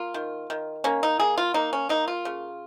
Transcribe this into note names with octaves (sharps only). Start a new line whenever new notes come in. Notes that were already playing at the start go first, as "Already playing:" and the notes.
Already playing: A#3 F4
D#3
D#3
A#3 C#4
D#4
A#3 G#4
F4
A#3 D#4
C#4
A#3 D#4
F4
C#3